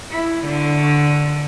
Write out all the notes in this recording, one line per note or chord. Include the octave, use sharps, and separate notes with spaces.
E4
D3